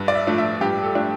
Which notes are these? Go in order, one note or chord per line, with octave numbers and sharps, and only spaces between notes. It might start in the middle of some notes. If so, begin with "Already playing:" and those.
Already playing: G2
D5
E5
F3 A3 D4
E5
G2 G4
A4
F3 A3 D4